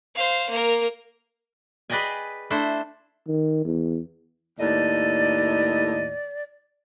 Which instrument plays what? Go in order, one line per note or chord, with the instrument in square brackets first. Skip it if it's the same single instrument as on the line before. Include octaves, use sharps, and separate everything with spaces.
[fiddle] C5 F5
A#3 A#4
[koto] G#4 B4 D5 D#5 G5 G#5
A3 D4 E4 A4 C5
[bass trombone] D#3
E2
[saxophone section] D#2 A2 D#5 [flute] D5